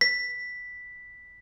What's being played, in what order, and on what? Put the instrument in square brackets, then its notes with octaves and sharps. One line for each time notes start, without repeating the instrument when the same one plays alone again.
[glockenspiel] B6